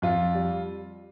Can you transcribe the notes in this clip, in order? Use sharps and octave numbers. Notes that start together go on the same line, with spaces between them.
F2 F4
G3